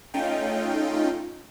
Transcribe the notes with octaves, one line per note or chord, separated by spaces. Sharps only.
A3 C#4 D#4 F4 G5